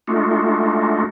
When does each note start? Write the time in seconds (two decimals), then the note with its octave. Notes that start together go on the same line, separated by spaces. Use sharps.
0.07 G#3 A3 D4 D#4 F4 F#4